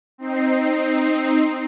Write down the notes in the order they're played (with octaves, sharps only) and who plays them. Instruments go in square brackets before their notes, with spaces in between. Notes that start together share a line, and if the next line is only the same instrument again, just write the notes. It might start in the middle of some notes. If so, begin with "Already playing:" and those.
[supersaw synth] C4 D#4 C7